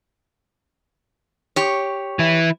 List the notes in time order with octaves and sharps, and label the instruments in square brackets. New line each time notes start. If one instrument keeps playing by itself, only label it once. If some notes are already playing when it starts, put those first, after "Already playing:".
[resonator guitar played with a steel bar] G4 C#5
[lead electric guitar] E3 E4